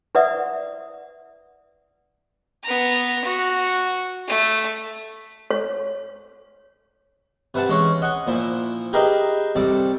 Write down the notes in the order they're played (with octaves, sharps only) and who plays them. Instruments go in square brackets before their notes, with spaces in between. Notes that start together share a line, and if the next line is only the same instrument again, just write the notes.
[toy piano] E4 B4 D5 E5 F#5 D#6
[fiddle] B3 A#5
F#4
A3
[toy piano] C#5
[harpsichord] C3 B4 E5 F#5 A5
E3 G#3 C#4 C#5
D#5 F#5 G#5
A#2 F3 E4
G4 G#4 A#4 B4 D#5 E5
C2 C3 A4 D5